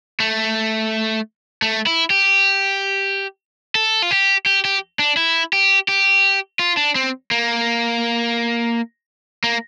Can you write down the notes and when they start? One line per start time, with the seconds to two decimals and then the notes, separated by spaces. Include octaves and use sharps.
0.20 A3
1.62 A3
1.87 E4
2.10 G4
3.75 A4
4.02 F4
4.11 G4
4.46 G4
4.65 G4
4.99 D4
5.17 E4
5.53 G4
5.88 G4
6.59 F4
6.77 D4
6.95 C4
7.31 A#3
9.44 A#3